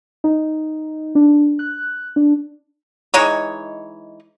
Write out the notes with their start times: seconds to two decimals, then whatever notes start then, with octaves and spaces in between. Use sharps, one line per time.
0.24 D#4
1.15 D4
1.59 F#6
2.16 D4
3.14 E3 G#3 D#4 C#5